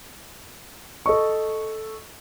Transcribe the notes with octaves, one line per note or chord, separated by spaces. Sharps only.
A4 D#5 C#6